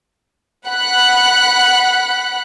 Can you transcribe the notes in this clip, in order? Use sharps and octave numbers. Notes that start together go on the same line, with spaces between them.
F#5 B5 F#6